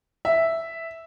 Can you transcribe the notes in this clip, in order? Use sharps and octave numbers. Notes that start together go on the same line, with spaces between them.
E5